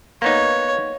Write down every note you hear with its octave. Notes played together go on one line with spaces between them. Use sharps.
A#3 B3 D#4 C#5